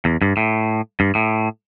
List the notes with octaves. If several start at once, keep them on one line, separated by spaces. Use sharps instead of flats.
E2
G2
A2
G2
A2